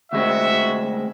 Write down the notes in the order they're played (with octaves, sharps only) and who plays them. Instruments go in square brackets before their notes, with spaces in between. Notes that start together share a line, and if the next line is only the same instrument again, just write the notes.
[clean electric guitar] D2 G#3 C4 [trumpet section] F#4 E5